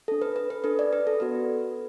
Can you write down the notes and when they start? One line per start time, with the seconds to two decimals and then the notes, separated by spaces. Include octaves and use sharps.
0.08 D4 A4
0.22 B4
0.36 B4
0.50 B4
0.64 D4 A4 B4
0.79 D5
0.93 B4
1.07 A4
1.20 B3 F#4 A4 B4